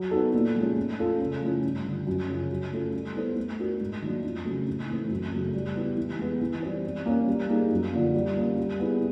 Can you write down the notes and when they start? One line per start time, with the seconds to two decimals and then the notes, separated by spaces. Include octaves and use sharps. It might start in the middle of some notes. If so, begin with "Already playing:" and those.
Already playing: F#3
0.11 B3 D#4 F#4 A4
0.34 A#2
0.55 F3 G#3 C#4
0.77 A3
0.99 C#4 F4 A4
1.20 C#3
1.42 F3 A3 C#4 E4
1.63 G2
1.85 D3 F3
2.07 F#2
2.28 C#3 F3
2.50 F#3
2.72 A3 C#4 F4 A4
2.94 G3
3.15 B3 E4 A4 C5
3.37 A3
3.58 D4 F#4 A#4
3.80 G#2
4.02 D#3 F#3 A#3 D4
4.24 F2
4.45 C#3 F#3 A3 C#4
4.67 A2
4.89 E3 A3 C4
5.11 F#2
5.32 C#3 F#3 A3
5.54 G3
5.75 B3 E4 G4
5.97 E3
6.19 G#3 B3
6.41 E3
6.63 G3 C4
6.84 G3
7.06 A#3 C#4
7.28 G3
7.49 A#3 D#4 G#4
7.71 F#2
7.93 D3 F3 A#3
8.14 G3
8.36 A#3 C#4
8.58 G3
8.80 B3 E4 G#4